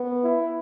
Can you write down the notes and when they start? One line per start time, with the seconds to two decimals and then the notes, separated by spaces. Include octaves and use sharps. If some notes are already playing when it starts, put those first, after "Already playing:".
Already playing: B3
0.23 E4